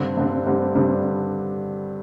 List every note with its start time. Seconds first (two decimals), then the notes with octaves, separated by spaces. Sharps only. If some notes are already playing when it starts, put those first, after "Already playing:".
Already playing: G2 D3 G3 C4
0.17 G2 D3 G3 C4
0.46 G2 D3 G3 C4
0.75 G2 D3 G3 C4